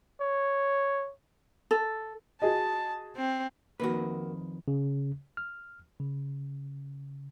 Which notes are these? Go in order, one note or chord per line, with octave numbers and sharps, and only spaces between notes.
C#5
A4
F#4 G#4 D#5 A5
C4
F2 D#3 A#3 F#4 B4
C#3
F6
C#3